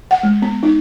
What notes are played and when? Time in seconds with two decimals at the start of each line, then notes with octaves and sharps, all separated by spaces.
0.11 F#5
0.23 G#3
0.42 B3
0.63 D#4